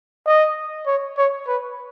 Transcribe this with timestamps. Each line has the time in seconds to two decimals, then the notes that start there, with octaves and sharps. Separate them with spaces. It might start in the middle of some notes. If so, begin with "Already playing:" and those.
0.26 D#5
0.87 C#5
1.17 C#5
1.47 B4